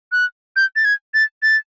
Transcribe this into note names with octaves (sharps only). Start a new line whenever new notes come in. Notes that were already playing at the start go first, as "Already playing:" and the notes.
F#6
G6
A6
G#6
A6
A6